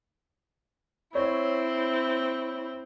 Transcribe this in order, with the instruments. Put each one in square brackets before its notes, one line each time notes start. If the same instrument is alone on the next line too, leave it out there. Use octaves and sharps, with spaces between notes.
[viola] C4 [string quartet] E4 [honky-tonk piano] C#5